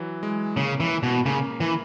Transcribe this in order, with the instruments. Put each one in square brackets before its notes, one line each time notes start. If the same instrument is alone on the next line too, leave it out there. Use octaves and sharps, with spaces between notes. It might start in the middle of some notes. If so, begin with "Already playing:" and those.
Already playing: [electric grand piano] E3 F#3
G#3
[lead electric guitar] C#3 [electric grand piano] A#3
[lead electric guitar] E3
B2
[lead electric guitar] C#3 [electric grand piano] A#3
[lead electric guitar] E3